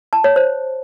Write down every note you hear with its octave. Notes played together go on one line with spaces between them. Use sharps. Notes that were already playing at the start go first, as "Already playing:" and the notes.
A5
C#5
C5